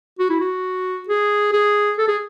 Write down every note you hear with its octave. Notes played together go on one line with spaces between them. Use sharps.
F#4
E4
F#4
G#4
G#4
A4
G#4